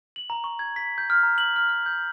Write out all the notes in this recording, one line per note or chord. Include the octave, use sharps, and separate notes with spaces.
F#7
A#5
C#6
G#6
B6
G6
F6
A#5
F#7
F6
F6
G6